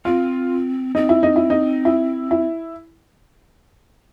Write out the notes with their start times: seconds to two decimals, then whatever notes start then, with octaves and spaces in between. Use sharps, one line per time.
0.05 C4 F4
0.95 C4 D#4
1.09 E4
1.23 D#4
1.36 E4
1.50 D#4
1.85 E4
2.31 E4